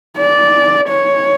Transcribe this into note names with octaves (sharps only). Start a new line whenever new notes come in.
D5
C#5